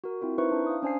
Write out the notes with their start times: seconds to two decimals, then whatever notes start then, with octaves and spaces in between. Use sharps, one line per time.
0.04 F#4 A#4
0.21 C4 E4 F4 A#4
0.38 D#4 E4 B4 C5 E5 C#6
0.52 D4
0.67 F5 D#6
0.82 C#4 D4 C5 G#5 C7